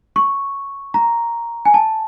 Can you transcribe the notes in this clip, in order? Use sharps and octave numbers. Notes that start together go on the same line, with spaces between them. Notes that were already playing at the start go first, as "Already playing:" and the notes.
C#6
A#5
G#5
A5